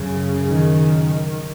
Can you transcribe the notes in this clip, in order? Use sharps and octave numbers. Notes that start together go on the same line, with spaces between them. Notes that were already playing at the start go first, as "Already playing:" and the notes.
Already playing: F#2 C#3
D#3